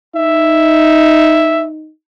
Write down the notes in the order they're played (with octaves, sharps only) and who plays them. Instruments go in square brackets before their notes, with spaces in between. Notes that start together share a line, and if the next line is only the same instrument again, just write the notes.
[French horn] D#4 [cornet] E5